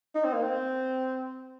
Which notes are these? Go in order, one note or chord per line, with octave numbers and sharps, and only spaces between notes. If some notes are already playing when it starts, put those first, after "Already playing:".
D#4
C4
A#3
C4